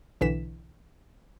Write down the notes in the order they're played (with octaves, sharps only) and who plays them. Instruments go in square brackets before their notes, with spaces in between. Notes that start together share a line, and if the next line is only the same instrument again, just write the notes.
[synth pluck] B1 D3 E3 B6 E7